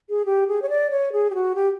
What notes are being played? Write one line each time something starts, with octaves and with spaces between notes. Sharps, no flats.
G#4
G4
G#4
C#5
D5
C#5
G#4
G4
F#4
G4